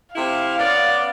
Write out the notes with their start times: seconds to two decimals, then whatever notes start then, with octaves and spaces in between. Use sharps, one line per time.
0.15 C3 A3 E4 F5
0.60 B3 C#4 D5